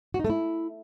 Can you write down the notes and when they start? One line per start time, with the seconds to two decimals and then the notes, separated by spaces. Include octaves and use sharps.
0.14 F#4
0.19 D#4
0.24 A3
0.30 E4